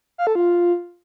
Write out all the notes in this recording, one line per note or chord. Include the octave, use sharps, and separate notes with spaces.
F5
A4
F4